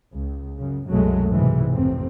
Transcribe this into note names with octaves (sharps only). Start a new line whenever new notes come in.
C#2
F#2 C#3
C2 F#2 B2 F#3 G#3 A3
B1 G#2 C3 E3
A1 F2 A2 C3 C4